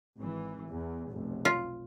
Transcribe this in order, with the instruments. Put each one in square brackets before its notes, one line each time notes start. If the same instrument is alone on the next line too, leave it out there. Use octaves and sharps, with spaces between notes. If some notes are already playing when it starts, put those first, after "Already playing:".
[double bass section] G#1 E3
E2
F1 B1
[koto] F4